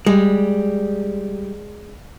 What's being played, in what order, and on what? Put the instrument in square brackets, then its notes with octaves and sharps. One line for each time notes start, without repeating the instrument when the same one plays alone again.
[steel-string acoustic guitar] G3 [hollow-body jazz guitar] G#3